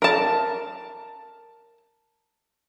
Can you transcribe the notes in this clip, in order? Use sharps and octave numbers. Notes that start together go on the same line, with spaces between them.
A#4 A5